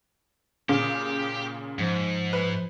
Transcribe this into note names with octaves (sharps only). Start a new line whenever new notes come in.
A#2 C#3 G4 G#4
G#2 F3
B4